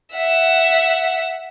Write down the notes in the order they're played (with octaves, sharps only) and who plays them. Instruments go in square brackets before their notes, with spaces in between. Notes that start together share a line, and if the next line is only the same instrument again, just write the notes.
[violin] E5 F#5